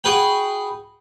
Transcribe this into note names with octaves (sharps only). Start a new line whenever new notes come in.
F#4 G#4 B4 G5